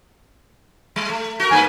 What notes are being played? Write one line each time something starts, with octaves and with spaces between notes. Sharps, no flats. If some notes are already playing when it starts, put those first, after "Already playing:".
G3
A3
F#4 A#4
G2 A#3 B4 G#5